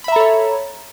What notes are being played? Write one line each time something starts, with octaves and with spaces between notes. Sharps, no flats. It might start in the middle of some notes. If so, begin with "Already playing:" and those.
A4 C#5 E5 A#5 B5